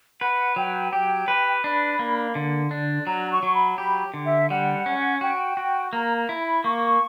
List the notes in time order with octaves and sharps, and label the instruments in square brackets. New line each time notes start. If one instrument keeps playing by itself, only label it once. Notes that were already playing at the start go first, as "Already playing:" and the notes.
[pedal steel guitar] B4 [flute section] F#5
[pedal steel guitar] F#3 [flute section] G5
[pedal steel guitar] G4 [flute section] G5
[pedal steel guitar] B4
[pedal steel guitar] D4 [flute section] B5
[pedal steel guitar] A#3
D3
D4
[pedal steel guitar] F#3 [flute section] A#5
[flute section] C#6
[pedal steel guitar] F#3
[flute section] B5
[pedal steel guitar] G4 [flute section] B5
[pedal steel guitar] D3
[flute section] E5
[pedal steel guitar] G3 [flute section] F#5
[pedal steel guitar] C#4
[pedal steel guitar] F#4 [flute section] G5
[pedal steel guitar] F#4
[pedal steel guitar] A#3 [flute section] A#5
[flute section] A#5
[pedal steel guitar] E4
[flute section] B5
[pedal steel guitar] A#3 [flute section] C#6